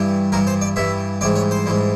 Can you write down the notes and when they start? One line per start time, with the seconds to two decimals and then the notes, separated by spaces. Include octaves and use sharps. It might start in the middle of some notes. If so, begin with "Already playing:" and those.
Already playing: G2 E3 G3
0.32 G2 E3 G3 A#4
0.47 C5
0.61 D5
0.76 G2 E3 G3 E5
1.21 G#2 E3 G3 D5
1.36 C#5
1.51 C5
1.66 G#2 E3 G3